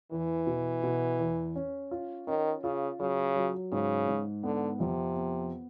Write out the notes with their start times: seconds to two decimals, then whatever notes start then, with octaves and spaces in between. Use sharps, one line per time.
0.11 E2 E3
0.47 B2
0.83 B2
1.19 E2
1.56 C#4
1.91 F4
2.27 D#3 C#4
2.64 C#3 F4
3.00 C#3 F#3
3.36 F#3
3.72 G#2 C#3
4.08 G#2
4.44 D3 B3
4.80 F2 C3
5.16 B3